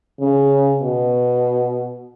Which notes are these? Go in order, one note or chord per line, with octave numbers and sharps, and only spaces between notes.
C#3
B2